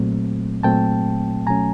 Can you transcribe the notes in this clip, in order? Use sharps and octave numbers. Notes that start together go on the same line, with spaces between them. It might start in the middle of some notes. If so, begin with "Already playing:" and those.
Already playing: A#2 F#3 A3 C4
A#2 F#3 A3 C4 G5 A5
B2 F#3 A3 C#4 G#5 A#5